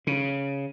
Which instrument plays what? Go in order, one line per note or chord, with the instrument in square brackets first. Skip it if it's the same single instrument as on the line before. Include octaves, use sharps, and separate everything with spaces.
[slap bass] C#3